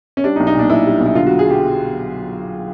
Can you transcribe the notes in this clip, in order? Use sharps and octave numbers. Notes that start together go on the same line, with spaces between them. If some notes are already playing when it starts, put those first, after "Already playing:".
C#4
G3 D4
D#4
B1
D#4
A#2 D4
B1 E4
G3
B1
E4
D3 F4
F#3 F#4
G#4
G4